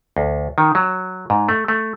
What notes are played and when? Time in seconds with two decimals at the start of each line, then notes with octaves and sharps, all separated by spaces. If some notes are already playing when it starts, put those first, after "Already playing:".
0.17 D2
0.58 D#3
0.75 F#3
1.30 G#2
1.49 A3
1.68 A3